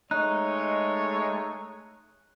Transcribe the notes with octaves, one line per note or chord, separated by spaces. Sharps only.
G#3 A3 D#4 C#5 F#6